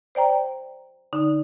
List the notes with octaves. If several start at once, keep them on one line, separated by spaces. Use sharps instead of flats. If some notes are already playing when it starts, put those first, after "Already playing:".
C5 D5 G5 A#5
D3 D#4